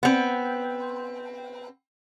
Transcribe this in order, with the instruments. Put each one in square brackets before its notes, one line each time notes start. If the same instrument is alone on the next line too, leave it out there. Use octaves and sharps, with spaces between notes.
[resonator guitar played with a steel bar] B3 C4